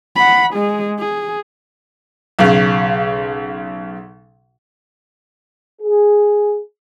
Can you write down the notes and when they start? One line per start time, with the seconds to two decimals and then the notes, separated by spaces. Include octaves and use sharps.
0.16 F#5 B5
0.53 G#3 G#4
0.99 G#4
2.39 B1 C#3
5.82 G#4